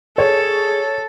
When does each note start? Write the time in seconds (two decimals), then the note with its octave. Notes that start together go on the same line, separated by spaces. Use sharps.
0.18 G#4 A4 C#5